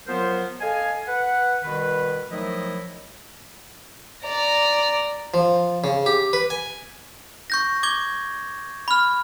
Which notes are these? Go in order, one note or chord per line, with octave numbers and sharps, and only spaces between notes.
F3 F#3 B3 A#4 C5
A4 D#5 F5 G#5
B4 F#5
B2 D#3 G3 B4
D#3 F3 F#3 A3 E4 D#5
D5 A#5
F3
C#3
G4
B4
G#5
C#6 G6 A#6
D6 G#6 G7
B5 F6